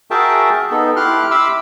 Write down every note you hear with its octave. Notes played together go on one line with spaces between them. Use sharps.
F#4 G#4 A#4 E5 G5 A5
B3 D#4 A4
E4 G4 C6 F6 F#6
E5 B5 C6 D6 E6